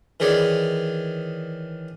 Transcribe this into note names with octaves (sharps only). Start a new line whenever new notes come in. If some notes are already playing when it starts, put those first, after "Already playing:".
D#3 E3 G#4 C#5 D5